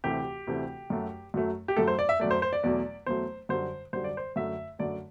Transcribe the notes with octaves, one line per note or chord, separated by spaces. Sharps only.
D2 C3 E3 A3 G4
D2 C3 E3 A3
F#2 F#3 A3
F#2 F#3 A3
G4
F#2 F#3 A3 A4
C5
D5
E5
F#2 F#3 A3 D5
C5
C5
D5
E2 B2 F#3 A3 D5
E2 B2 F#3 A3 C5
F#2 D3 G3 C5
F#2 D3 G3 C5
D5
C5
F#2 D3 A3 E5
F#2 D3 A3 D5